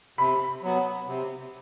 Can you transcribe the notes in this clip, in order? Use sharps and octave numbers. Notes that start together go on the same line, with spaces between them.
C3 B5
F#3 B3
C3